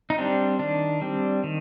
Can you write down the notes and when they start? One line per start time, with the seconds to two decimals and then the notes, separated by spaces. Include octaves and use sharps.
0.10 D#4
0.18 G3 C4 D4
0.59 D#3 D4
1.01 G3 C4
1.44 D#3